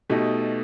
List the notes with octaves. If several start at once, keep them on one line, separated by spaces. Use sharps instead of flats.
B2 A3 D#4 G4